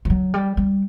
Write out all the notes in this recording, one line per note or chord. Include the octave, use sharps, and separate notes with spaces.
F3
F#3
G3
G3